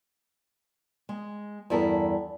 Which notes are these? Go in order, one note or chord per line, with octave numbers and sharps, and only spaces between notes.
G#3
E2 G2 E4 A4 A#4